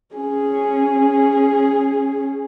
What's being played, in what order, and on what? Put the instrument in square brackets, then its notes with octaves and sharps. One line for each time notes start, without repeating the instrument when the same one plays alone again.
[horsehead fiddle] C#4 G#4